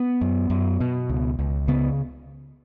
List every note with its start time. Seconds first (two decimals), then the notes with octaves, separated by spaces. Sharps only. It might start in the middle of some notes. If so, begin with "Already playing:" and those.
Already playing: B3
0.21 F#2
0.50 F#2
0.80 B2
1.10 C#2
1.39 C#2
1.68 C#3 B3